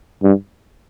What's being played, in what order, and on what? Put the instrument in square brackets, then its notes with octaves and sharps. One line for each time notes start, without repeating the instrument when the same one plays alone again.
[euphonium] G2